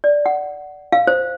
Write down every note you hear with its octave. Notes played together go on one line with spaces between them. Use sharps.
D5
F#5
F5
C5